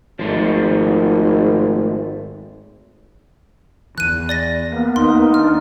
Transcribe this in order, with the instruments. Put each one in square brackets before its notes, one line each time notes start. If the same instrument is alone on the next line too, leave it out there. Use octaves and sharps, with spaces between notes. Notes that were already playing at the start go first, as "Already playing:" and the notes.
[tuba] G#1 [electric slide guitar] F3 G#3 A3
[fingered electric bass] E2 E3 [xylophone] F#6 D#7
[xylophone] D5 A6 A#6
[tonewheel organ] A#3 B3
[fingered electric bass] D#2 [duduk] D#4 [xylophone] C6
[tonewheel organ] D4 [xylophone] F6